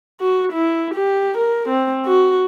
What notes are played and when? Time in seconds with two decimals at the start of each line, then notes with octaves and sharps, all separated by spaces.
0.20 F#4
0.52 E4
0.95 G4
1.38 A#4
1.69 C4
2.06 F#4